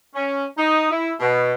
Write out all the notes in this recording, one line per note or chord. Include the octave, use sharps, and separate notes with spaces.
C#4
D#4
E4
B2